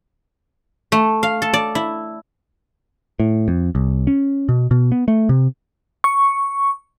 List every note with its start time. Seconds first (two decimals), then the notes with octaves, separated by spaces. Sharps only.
0.92 A3
1.23 F5
1.42 A4
1.53 D5
1.75 E4
3.20 A2
3.48 F2
3.75 C2
4.07 C#4
4.49 B2
4.71 B2
4.92 B3
5.08 A3
5.29 C3
6.04 C#6